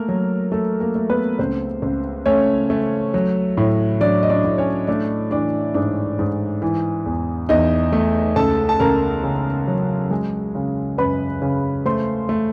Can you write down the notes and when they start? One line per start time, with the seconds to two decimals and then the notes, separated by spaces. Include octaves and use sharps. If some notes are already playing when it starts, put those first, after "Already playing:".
Already playing: A3 A#3 A#4
0.09 F#3
0.52 A3 A4
0.80 A#3 A#4
0.95 A3
1.10 B3 B4
1.39 C#2 C4 C5
1.82 C#2
2.26 A3 C#4 C#5
2.70 A3
3.14 F#3
3.57 A2
4.00 F#3 D4 D5
4.23 D#5
4.29 D4 D5
4.44 A2
4.58 C#4 C#5
4.87 A3 D4 D5
5.31 E3 D4 D5
5.74 G#2 D4 D5
6.19 G#2
6.62 E3
7.06 E2
7.49 E2 D#4 D#5
7.92 A3
8.36 C#2 A4 A5
8.69 A5
8.80 C#2 A#4 A#5
9.23 C#3
9.68 F#3
10.11 G#3
10.55 C#3
10.98 F#2 B4 B5
11.42 C#3
11.86 A3 C5 C6
12.29 A3